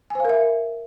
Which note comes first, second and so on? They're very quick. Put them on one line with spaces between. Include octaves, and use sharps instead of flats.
G#5 C5 F5 A#4 E5